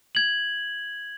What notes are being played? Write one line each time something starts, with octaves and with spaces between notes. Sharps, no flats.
G#6 F#7